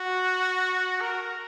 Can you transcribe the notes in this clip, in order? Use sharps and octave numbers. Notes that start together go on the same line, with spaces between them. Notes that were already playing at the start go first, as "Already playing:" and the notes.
Already playing: F#4
A#4